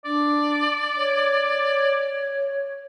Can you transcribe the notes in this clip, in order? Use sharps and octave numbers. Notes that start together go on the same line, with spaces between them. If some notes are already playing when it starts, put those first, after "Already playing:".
D4 D5
C#5